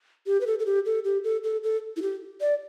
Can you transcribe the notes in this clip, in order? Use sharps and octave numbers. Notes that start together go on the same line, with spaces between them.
G4
B4
A4
A4
G4
A4
G4
A4
A4
A4
E4
G4
D5